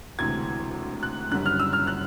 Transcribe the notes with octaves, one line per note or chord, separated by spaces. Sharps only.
E1 D2 C3 E3 G#6
F#6
F#1 F#2 D3 G3 F#6
F6
E6
F6
F#6